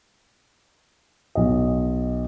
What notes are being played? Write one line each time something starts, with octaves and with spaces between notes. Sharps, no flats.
B1 D#5